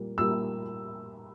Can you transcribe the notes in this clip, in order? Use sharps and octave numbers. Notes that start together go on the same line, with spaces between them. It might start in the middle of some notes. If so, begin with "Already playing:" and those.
Already playing: A#2 G3 A#3
A#2 G3 A#3 E6